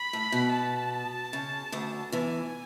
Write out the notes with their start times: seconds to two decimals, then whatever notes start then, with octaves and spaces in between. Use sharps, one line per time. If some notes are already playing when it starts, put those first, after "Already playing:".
Already playing: B5
0.13 A2
0.32 B2
0.52 A5
1.33 C#3
1.72 D2 D3
2.12 E2 E3 G#5